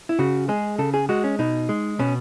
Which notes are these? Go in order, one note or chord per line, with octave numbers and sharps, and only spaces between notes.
E4
C#3 F#4
G#3 G#4
C#3 A4
G#4
G#3 F#4
C#4
B2 D#4
G#3
B2 C#4